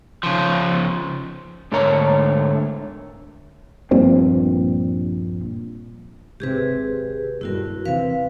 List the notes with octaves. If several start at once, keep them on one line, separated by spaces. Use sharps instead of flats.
C#3 F3
G#2 D3 A3 A#4 C#5 A#5
A#1 G2 A#2 C4
G#1 C3 G4 G#4 B4
D#1 G2 E4 F#4 A#4
E2 C3 B4 F5